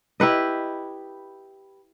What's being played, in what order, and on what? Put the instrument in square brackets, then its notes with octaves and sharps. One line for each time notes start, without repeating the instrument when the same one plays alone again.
[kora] E4 G4 B4 D#5